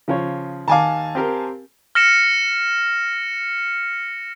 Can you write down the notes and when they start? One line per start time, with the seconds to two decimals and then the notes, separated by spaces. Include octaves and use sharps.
0.08 C#3 F3 C#5
0.68 D#2 F5 G#5 A5 D6
1.15 C4 G4 A#4
1.95 F6 A#6 C#7 E7